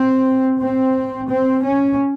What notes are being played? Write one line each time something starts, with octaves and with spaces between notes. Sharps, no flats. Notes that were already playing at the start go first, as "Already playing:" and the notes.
Already playing: C4
C4
C4
C#4